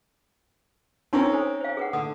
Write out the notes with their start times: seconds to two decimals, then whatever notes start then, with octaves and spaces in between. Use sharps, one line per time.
1.13 C4 C#4 D#4 F4 A#4 B4
1.32 A4 C5 G#5
1.61 C5 F5
1.77 G#4 B4 F#5
1.93 D3 D#6